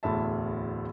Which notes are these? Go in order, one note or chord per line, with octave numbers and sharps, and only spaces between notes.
D1 E2 A2 E5 A5